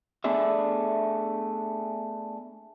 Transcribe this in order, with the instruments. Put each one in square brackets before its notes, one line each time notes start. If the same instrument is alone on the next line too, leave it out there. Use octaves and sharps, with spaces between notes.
[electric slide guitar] A3 B3 D4 G#4 D5 E5